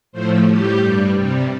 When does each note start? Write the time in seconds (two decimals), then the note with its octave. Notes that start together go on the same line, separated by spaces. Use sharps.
0.12 A2 F3 A3 C5
0.47 A2 G3 G4
0.81 G2 G3
1.14 C3 G3